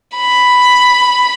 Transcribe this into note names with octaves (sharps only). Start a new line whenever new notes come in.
B5